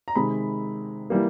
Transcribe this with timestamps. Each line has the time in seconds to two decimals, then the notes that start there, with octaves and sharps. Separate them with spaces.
0.08 A#5
0.16 C3 D#3 G#3 B5
1.10 E3 G3 A#3